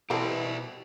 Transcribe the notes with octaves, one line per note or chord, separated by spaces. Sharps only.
B2 E3 G3 C4 G4 A4 D5 E5